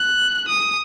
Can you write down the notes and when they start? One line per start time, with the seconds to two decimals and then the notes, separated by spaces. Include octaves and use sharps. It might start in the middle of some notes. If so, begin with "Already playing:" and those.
Already playing: F#6
0.48 D#6